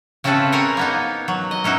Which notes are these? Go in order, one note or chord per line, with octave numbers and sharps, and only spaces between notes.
C#3 C4 C#4 E4 A4 B4
A#4 C5 C#5 F#5 G#5 A#5
A#3 B3 D#4
F#3
D#5
C#4 D#4 E4 F#4